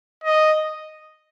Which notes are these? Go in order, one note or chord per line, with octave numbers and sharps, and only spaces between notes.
D#5